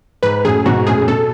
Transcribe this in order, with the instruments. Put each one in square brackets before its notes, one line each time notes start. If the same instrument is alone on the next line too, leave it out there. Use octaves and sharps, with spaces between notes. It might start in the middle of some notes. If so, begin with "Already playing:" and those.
[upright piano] G#2 [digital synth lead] B4
[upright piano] F#2 A2 [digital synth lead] G#4
[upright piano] G#2 B2 [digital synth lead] F#4
[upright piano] F#2 A2 [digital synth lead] G#4
[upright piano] A2
[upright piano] B2 [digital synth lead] A4